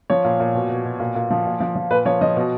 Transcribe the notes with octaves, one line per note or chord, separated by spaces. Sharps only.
F3 C#5
A#2
A#2
B2
B2
B2
A#2
A#2
F3
A#2
F3
F3
A#2 B4
F3 C#5
F3 D#5
B2